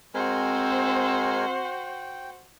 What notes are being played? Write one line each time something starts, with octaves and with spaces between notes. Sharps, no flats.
G#3 C4 F#4 A#4 C5 G#5
G5